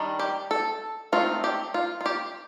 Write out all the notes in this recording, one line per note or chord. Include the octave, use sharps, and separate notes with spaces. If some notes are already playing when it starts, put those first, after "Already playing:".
Already playing: D#3 G3 D4
G4
A4
D#3 A3 C4 D#4 F4
G4
F4
F4
G4